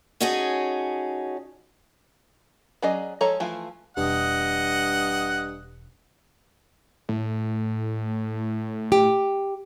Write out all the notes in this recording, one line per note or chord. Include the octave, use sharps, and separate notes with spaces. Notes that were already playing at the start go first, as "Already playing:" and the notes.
C#4 D#4 F#4 G#4 A4 C#5
F#3 C#4 G#4 D5 D#5
F3 G#3 A4 C#5 A#5
E3 F3 A3 E4 F4
E1 G2 D#5 F#5
A2
G4